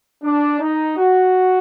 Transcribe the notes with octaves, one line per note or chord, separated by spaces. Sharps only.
D4
D#4
F#4